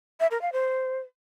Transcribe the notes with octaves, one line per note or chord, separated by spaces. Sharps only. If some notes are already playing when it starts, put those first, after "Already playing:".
E5
A#4
F5
C5